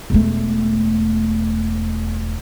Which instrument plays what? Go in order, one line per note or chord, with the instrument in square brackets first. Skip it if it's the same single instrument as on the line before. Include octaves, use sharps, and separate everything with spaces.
[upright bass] E1 A3